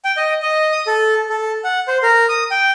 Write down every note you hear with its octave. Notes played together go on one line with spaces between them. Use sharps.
G5
D#5
D#5
D#6
A4
A4
F#5
C5
A#4
D#6
G5